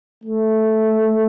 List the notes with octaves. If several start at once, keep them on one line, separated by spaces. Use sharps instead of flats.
A3